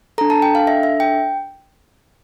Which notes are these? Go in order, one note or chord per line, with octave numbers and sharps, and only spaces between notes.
D4 A4 A#5
A5
G5
F5
E5
E5
G5